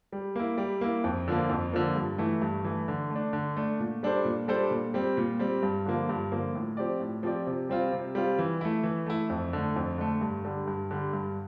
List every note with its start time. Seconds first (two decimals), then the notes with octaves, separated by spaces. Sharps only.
0.12 G3
0.36 A#3 E4
0.58 G3
0.81 A#3 E4
1.04 F2
1.28 D3 F3 A#3
1.50 F2
1.73 D3 F3 A#3
1.96 G2
2.18 E3 A3 E4
2.42 G2
2.65 E3 A3 E4
2.88 D3
3.10 A3
3.15 D4
3.33 D3
3.57 A3 D4
3.79 A#2
4.03 G3 D4 A4 C5
4.25 A#2
4.48 G3 D4 A4 C5
4.71 A#2
4.94 G3 C4
5.17 A#2
5.39 G3 C4
5.63 G2
5.86 D3 F3 A#3
6.09 G2
6.31 D3 F3 A#3
6.55 A2
6.77 F3 C4 G4 D5
7.00 A2
7.23 F3 C4 G4 D5
7.47 C3
7.69 G3 C4 F4
7.92 C3
8.15 G3 C4 F4
8.39 E3
8.61 A3 E4
8.83 E3
9.06 A3 E4
9.30 F2
9.53 D3 A3
9.76 F2
9.98 D3 A3
10.21 G2
10.45 D3 G3
10.67 G2
10.91 D3 G3
11.13 G2